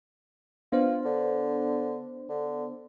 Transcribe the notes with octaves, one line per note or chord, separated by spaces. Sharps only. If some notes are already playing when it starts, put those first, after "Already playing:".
B3 D4 F4 C5
D3
D3